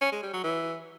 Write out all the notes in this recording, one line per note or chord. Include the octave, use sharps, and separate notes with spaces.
C#4
G#3
G3
F#3
E3